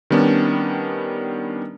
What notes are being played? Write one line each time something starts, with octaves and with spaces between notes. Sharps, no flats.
D#3 G3 B3 C#4 D4